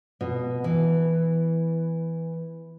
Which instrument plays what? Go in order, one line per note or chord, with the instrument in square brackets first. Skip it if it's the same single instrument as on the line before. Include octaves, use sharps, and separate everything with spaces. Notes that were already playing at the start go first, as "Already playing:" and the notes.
[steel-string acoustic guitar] B2
E3